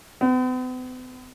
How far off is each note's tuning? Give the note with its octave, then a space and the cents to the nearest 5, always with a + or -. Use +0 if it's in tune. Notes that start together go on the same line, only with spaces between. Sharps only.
B3 +45